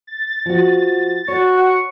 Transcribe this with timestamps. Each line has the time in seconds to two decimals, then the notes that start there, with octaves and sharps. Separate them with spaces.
0.07 A6
0.46 F3 F#4
1.28 F#4 C#5 C#6